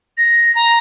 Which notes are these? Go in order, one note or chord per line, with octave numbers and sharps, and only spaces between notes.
A#6
A#5